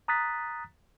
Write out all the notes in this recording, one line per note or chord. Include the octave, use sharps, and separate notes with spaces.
A#5 D#6 F#6 A6 B6